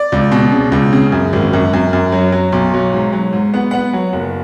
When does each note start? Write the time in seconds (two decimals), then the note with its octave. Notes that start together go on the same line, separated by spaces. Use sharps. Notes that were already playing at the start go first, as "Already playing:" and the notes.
Already playing: D5
0.12 C#2
0.32 B2
0.52 C#3
0.72 C#2
0.93 C#3
1.12 F#2
1.33 G#1
1.53 F#2
1.73 F#2
1.93 F#2
2.12 F#3
2.32 F#3
2.52 B1
2.74 F#3
2.93 G#2
3.13 F#3
3.33 G#2
3.54 B3 F#5
3.71 B3 F#5
3.93 F#3
4.13 F#1